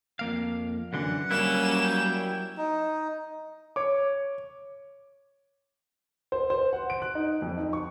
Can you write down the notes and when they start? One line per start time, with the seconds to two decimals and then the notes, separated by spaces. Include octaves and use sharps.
0.19 F2 A#3 F5
0.93 F#2 D3 E3 F#5
1.31 F#3 G3 A#3 C#4 E4 E7
1.84 G5
2.58 D#4
3.76 C#5 D6
6.32 C5
6.50 C5
6.73 F#5
6.90 D7
7.02 F#6
7.15 D#4
7.42 F2
7.57 D#4
7.73 C#6